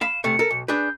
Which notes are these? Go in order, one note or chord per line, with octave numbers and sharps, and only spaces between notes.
F5 B5 E7
E2 C3 A3 C#7
A4 A#4
B1
D4 G#4 B4 G6